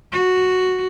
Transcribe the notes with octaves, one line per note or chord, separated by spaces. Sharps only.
F#4